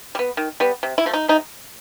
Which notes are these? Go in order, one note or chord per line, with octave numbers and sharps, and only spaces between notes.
G3
B3
D#3
G3 B3
C3
E4
F3 A3
D#4
C3 D#4